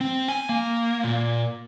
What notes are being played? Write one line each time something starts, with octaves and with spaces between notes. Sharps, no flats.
C4
G#5
A#3
A#2